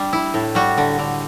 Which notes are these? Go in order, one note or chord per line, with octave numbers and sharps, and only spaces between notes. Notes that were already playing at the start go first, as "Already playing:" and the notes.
Already playing: G3 D4
E4
A2
G3 F#4
D3
D3